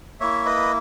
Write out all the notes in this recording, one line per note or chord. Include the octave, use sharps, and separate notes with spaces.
A#3 E4 C#5 E5
B4 D#5